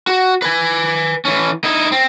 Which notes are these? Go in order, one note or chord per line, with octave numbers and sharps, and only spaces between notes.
F#4
B4 G#5
E3 C#4
D#4 E4
C4